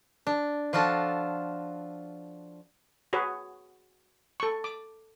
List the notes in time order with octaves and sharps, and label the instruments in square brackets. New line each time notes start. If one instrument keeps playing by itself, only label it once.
[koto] D4
F3 D4 F4 F#4 A4
[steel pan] F#4 G#4 B4 C#5
A4 C#6
D6